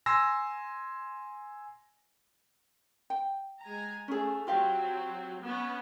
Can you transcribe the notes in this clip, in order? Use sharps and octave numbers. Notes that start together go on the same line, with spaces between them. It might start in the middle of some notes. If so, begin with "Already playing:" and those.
G#5 C6 E6 A#6
G5
G#3 G#5 A#5
A3 C#4 G#4
F#3 C4 F4 G4 F5
B3 C#4